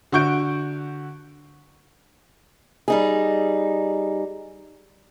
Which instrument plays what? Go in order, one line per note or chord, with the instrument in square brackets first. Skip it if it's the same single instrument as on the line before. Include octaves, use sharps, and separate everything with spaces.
[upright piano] D3 F#4 C#6 G6 D7
[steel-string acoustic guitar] G3 D#4 G#4